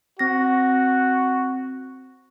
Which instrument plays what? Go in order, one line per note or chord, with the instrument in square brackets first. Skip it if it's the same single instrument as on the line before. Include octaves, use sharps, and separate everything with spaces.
[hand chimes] C4 A#6 [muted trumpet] F#4